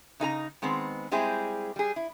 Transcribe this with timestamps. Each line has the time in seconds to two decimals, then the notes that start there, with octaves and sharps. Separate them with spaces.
0.20 C#3 D#4 A4 A#5
0.62 D#3 G#3 B3 C4
1.12 G3 G#3 C4 E4 G#4
1.76 G3 G#4
1.96 E4